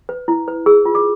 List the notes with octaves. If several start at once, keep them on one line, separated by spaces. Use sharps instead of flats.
B4
E4
B4
G#4 E6
F4
D6